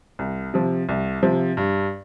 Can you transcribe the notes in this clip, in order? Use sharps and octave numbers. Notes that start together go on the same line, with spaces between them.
C2
C3 F3
C2
C3 F3
G2